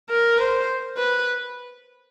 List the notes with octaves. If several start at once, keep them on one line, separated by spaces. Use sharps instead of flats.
A#4
C5
B4